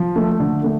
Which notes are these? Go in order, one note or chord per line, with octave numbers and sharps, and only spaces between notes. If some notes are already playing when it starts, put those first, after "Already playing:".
Already playing: F3
A3
D3
A3